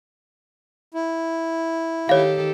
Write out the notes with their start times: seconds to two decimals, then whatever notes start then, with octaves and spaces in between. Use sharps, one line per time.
0.94 E4
2.09 D#3 G4 A4 C#5 F5